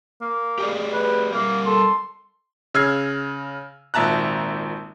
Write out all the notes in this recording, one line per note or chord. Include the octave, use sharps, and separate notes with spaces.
A#3
G4 G#4 D5
B4
G3 A#3 A#4
A4 C6
C#3 E6 F6 G#6 C7
G#1 A#2 E5 A5 A#5 F#6